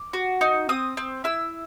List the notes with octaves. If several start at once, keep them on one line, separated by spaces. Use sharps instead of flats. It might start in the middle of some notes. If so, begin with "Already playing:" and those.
Already playing: D6
F#4
D#4
C4 D#6
C4
E4 E6